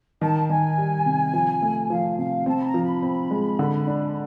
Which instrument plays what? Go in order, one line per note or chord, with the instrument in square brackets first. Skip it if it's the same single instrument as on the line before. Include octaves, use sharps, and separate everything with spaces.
[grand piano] D#3 [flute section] A5
[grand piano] D#3 [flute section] G#5
[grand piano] G3
C3
F3
A3
[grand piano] F3 [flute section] F5
[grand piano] C3 [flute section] F5
[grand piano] C4 [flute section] A5
[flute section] B5
A#5
[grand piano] F3
[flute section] B5
[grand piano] C4
G#3
D3
D4